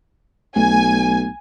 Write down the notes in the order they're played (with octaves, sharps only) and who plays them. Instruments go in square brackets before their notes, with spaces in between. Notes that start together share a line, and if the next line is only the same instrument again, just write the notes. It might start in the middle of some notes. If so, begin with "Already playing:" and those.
[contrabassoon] B1 [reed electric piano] A3 [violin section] G#5